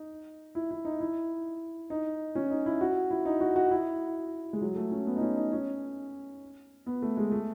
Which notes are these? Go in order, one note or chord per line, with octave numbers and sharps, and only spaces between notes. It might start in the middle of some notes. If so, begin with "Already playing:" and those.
Already playing: D#4
E4
E4
D#4
E4
D#4
C#4
D#4
E4
F#4
E4
D#4
F#4
F#4
E4
G#3
F#3
A3
C#4
B3
D#4
C#4
D#4
C#4
B3
A3
G#3
A3